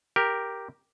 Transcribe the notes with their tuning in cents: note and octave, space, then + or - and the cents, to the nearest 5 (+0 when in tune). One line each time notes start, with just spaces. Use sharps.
G4 +0 A#4 +0